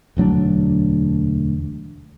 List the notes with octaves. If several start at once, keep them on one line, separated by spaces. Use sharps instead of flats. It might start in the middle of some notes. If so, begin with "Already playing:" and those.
E1 D2 F#3 D4